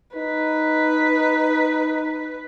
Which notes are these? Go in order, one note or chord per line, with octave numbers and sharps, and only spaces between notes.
D#4 B4